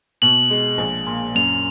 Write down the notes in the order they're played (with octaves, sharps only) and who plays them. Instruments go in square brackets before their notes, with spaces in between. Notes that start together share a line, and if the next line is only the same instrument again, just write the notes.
[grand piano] B2 [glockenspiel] F#7
[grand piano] G#3
A#1
A#2
[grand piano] F#2 [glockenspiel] F7